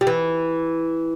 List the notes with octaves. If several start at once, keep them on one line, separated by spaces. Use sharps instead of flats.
G3
E3